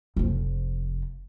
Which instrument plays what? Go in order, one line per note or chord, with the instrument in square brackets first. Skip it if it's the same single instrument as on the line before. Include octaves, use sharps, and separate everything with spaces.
[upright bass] F1 F3